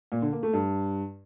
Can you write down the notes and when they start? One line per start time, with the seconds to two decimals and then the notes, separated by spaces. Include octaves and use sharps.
0.12 A#2
0.22 D3
0.32 A#3
0.43 A3
0.53 G2